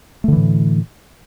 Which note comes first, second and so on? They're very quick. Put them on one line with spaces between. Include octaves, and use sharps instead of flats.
A3 D3 E3 A2